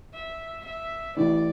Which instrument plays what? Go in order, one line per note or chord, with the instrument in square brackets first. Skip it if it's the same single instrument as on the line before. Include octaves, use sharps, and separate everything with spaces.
[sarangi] E5
E5
[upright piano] A1 A2 [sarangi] D5